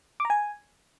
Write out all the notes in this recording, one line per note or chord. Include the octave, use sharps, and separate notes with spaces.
D6
A#5
G#5